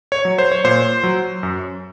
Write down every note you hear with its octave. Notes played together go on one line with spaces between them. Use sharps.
C#5
F#3
C5
C#5
A#2 C5
F#3
F#2